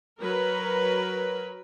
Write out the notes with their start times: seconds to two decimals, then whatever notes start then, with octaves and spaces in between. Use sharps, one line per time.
0.21 F#3 A#4 B4